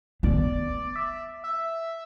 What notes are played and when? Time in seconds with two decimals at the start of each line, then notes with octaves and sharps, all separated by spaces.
0.23 B3 D5
0.96 E5
1.44 E5